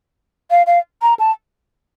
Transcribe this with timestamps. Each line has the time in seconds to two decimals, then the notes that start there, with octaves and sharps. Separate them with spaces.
0.51 F5
0.67 F5
1.02 A#5
1.19 A5